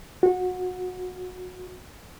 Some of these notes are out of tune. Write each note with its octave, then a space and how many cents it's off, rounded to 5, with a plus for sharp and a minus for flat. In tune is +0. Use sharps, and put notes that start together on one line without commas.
F#4 -20